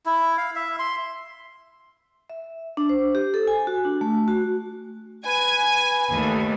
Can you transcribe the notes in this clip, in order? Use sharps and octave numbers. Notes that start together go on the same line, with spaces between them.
E4
F5
E5
C6
E5
D4
C5
G4
A4
G#5
F#4
D4
A3
F#4
B4 G#5
D#2 A3